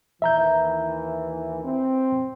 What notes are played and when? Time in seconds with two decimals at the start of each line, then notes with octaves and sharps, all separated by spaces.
0.22 D#2 E3 E5 A#5 G6
1.63 C4